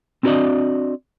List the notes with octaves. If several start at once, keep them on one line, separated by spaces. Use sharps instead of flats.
C4 D4 F#4 A#4 D5 D#5